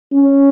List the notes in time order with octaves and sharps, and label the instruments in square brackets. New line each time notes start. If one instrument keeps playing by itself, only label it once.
[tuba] C#4